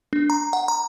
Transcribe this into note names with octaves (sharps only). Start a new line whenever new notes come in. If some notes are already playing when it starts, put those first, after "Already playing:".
D4
A#5
F#5
A#5